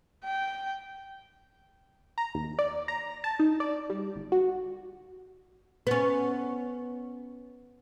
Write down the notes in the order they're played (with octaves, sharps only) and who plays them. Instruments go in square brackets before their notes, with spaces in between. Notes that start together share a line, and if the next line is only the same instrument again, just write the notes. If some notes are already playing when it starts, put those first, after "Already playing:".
[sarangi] G5
[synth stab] A#5
D#2
D5
A#5
A5
D#4
D5
G3
G1
F#4
[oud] B3 C#4